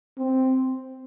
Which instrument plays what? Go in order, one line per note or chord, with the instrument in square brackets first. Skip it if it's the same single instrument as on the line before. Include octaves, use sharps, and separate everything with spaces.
[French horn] C4